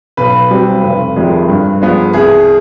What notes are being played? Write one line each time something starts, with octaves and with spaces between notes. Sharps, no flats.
B1 B4
B2 G3 C4
F1
F2 C3 D#3 G#3
G2
F3 G#3 B3
C2 G#4